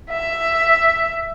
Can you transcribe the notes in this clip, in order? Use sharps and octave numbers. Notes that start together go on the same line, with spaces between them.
E5